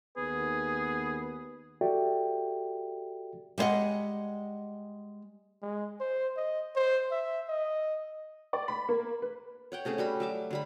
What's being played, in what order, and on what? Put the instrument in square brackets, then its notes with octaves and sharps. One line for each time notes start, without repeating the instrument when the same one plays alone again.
[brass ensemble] D#2 B3 [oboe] G#4 [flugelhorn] B4
[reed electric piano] F#4 G4 A4 D5 E5 G5
[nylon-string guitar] G3 G#3 C5 D#5 F#5
[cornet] G#3
C5
D#5
C5
E5
D#5
[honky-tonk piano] D5
B5
A#3
B4
[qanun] C#5 F#5 G5
C3 A3 C#4 G#4
G3 F#4 B5
F#3 E5 D6
D3 G3 B5